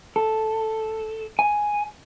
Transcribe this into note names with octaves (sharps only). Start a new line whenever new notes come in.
A4
G#5